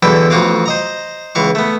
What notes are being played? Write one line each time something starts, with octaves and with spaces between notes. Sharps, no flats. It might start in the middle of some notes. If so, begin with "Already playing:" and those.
E2 B2 D3 E3 A4 G5
A1 F2 F4 F#4 F5 D6
C5 D#5 A#5
C#2 E3 F5 C#6
A3 B3